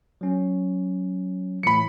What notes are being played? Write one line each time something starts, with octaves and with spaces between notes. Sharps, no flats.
F#3 C#4
A2 E3 B5 C#7